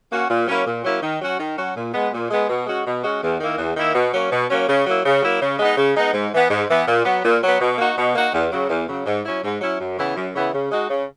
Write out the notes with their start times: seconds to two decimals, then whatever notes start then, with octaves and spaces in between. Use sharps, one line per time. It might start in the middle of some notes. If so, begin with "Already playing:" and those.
0.11 A#3 C#4 F#4
0.29 A#2
0.47 F#3 A#3 C#4 E4
0.66 A#2
0.84 F#3 A#3 C#4 E4
1.02 D#3
1.21 F#3 C#4 F#4
1.40 D#3
1.58 F#3 C#4 F#4
1.76 A#2
1.94 G#3 B3
2.12 A#2
2.31 G#3 B3
2.49 B2
2.67 G#3 C#4 F#4
2.86 B2
3.04 G#3 C#4 F#4
3.22 E2
3.40 D#3 A#3 E4
3.58 E2
3.77 D#3 A#3 E4
3.95 B2
4.14 F#3 A#3 C#4
4.31 B2
4.50 F#3 A#3 C#4
4.68 C#3
4.87 F#3 A#3 E4
5.05 C#3
5.23 F#3 A#3 E4
5.42 C#3
5.59 G#3 B3 D#4
5.77 C#3
5.96 G#3 B3 D#4
6.14 G#2
6.33 E3 B3
6.50 G#2
6.69 E3 B3
6.88 A#2
7.05 F#3 B3
7.24 A#2
7.42 F#3
7.47 B3
7.61 B2
7.78 A#3 D#4 F#4
7.98 B2
8.15 A#3 D#4 F#4
8.33 E2
8.51 C#3 F#3
8.70 E2
8.88 C#3 F#3
9.06 G#2
9.25 F#3 C#4 E4
9.44 G#2
9.61 F#3 C#4 E4
9.80 F#2
9.98 C#3 E3 B3 E4
10.16 F#2
10.35 C#3 E3 B3 E4
10.53 C#3
10.71 G#3 D#4 F#4
10.90 C#3